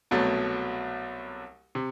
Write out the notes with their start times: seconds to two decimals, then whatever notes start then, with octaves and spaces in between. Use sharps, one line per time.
0.11 C2 B2 F#3 A3
1.75 C3